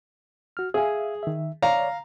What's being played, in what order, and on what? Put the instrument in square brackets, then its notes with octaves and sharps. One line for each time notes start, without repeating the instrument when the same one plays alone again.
[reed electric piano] F#4 F6
[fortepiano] G#4 [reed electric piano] E5 F5 G#5
[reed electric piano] D#3 E5
[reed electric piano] C#5 D5 [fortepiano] F5 A#5